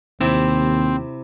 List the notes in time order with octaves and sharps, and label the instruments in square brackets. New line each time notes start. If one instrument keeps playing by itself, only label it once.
[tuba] D#2 [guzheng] C3 E4 [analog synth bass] C4